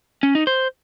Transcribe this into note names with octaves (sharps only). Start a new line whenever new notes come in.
C#4
D#4
C5